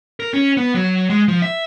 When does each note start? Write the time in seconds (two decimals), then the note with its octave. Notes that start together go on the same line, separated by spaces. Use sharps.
0.20 A#4
0.34 C#4
0.57 B3
0.75 F#3
1.10 G#3
1.28 F3
1.42 E5